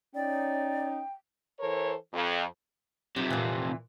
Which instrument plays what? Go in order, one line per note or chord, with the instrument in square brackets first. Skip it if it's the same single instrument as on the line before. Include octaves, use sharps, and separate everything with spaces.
[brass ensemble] C#4 D#4 [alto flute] D5 [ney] G5
[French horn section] E3 A4 A#4 C5 C#5
F2
[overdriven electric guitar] F2 C3 [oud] F#3 D#4
[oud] A#2 E3